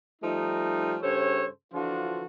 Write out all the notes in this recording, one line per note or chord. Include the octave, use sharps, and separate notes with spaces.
F3 G3 A3 D#4
G2 C#3 A4 C5 C#5
D3 E3 F3 D4 F4 F#4